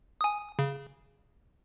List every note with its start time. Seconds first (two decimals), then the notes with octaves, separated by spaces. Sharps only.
0.21 G#5 D#6
0.59 C#3